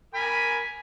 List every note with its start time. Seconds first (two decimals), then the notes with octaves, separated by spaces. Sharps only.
0.14 A#4 G#5 B5